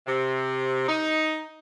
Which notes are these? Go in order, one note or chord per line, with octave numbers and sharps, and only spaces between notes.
C3
D#4